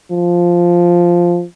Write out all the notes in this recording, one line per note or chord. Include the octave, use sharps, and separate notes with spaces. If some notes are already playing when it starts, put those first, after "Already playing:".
F3